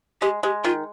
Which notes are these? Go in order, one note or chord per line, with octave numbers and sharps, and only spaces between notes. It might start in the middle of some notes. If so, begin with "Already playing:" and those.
G#3 G4
G#3 G4
D#3 F4